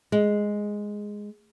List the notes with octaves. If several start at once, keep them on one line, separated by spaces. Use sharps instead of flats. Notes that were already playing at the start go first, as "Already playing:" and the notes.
G#3